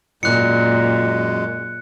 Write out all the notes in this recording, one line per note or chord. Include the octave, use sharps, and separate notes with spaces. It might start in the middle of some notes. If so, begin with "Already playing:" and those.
F#2 A#2 G#3 F#6 C#7